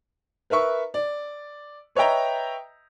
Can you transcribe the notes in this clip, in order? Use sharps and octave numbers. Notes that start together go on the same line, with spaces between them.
A#4 B4 E5 C#6
D5
B4 C#5 D#5 E5 G5 A#5